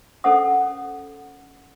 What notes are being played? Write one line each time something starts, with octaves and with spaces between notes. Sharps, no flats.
C#4 A4 A#4 C5 F#5 D#6